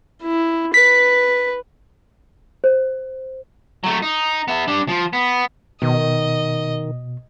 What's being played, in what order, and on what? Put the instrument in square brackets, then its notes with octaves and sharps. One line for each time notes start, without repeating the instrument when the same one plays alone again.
[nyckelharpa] E4
[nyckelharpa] B4 [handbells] B6
[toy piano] C5
[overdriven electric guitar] F#3 A3
D#4
B3 E5
G3 D4
F3
B3
[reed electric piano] B2 [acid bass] D#3 [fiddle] D#5